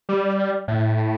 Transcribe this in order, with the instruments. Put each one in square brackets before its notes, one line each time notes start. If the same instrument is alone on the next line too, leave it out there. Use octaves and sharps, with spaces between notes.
[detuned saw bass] G3
A2